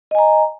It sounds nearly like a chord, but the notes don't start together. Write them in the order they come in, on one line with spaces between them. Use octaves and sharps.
D#5 G#5 A#5